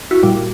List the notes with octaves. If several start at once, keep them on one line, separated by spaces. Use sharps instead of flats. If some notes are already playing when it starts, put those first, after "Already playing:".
E4 F#4
A#2 G3